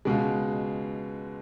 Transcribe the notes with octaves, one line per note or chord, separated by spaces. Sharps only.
C#2 B2 G#3